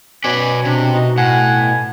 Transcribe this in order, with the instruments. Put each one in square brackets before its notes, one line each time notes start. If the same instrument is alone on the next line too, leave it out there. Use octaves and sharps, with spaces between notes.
[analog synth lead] B2 [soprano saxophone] C#4 [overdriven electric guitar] B4 D5 [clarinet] G#5
[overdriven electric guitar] C3 [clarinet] D4
[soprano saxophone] D#4 [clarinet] F#4
[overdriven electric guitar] A2 [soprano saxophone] F#5 [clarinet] G#5